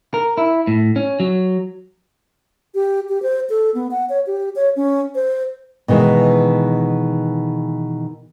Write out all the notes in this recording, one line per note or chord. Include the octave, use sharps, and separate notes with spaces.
A#4
E4
A2
C#4
F#3
G4
G4
C5
A4
B3
F#5
C#5
G4
C#5
C#4
C5
B2 D#3 E3 G#3